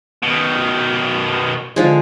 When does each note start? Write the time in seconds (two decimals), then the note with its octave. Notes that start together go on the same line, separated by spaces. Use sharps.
0.23 B2 D#3
1.76 D3 F3 G#3